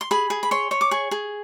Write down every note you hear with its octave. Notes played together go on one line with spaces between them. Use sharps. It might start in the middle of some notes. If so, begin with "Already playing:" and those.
C6
G#4 B5
G#4
B5
C#5 C6
C#5
D6
G#4 C#6
G#4